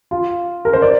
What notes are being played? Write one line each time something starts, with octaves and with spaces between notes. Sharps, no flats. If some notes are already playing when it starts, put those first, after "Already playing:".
F4
A#4
C5
D5